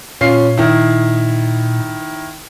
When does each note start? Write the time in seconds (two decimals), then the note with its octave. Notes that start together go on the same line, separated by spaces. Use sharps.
0.21 A#2 C#4 F4 C7
0.58 D#3 E4